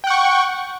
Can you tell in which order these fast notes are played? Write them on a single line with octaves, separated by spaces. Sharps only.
G5 F#5 C#6